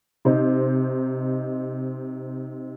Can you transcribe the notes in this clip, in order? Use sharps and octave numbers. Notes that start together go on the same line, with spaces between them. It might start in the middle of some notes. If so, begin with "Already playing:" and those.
C3 D#4 C5